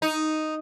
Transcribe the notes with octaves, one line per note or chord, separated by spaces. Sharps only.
D#4